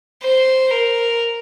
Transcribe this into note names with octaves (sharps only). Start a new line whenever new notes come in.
C5
A#4